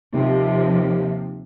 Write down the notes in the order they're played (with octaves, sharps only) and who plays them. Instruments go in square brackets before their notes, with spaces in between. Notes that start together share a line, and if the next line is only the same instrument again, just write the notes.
[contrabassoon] D#2 [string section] C3 F3